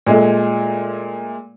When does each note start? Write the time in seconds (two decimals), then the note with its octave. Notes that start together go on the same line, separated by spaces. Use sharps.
0.07 A#2 G#3 A3